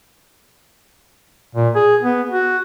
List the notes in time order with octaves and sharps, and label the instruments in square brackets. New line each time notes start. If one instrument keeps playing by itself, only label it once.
[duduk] A#2
G#4
B3
F#4